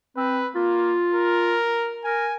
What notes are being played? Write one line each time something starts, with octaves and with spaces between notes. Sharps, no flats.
C4 B4
A#3 F4
A#4
A#4 G#5